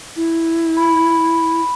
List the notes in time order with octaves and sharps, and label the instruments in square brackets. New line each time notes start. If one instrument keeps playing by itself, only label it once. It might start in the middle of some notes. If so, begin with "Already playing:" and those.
[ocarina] E4
[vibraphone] B5